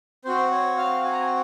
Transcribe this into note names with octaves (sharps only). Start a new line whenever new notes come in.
C4 F#4 C5
C#5
F5
G#5
A#5
G#5